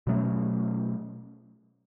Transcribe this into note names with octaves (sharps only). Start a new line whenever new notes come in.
B2 F#3 A3 C#4